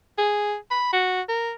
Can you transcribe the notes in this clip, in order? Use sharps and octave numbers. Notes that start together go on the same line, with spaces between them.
G#4
B5
F#4
A#4